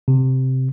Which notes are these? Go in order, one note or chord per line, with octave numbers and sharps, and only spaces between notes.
C3